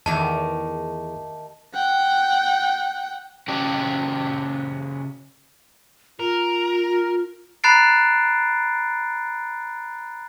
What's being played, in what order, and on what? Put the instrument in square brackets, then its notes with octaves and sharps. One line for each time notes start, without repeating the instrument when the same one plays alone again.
[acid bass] E2 [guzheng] D#3 A3 G4 [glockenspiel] A5
[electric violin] F#5 G5
[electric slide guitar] C#3 F#4 G4 D5
[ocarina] F4 [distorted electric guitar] A#4
[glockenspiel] A#5 B5 F#6 A6 C7 D7